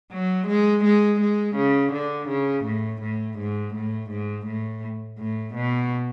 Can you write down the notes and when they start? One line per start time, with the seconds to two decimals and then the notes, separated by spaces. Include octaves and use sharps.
0.13 F#3
0.48 G#3
0.85 G#3
1.21 G#3
1.56 C#3
1.93 D3
2.29 C#3
2.65 A2
3.02 A2
3.39 G#2
3.75 A2
4.11 G#2
4.46 A2
5.19 A2
5.55 B2